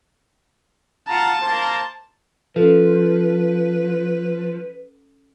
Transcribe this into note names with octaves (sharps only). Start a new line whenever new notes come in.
F4 F#5 A5 A#5
A#3 A#4 C5
F3 C#4 A4 B4